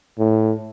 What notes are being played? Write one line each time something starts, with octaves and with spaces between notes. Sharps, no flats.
A2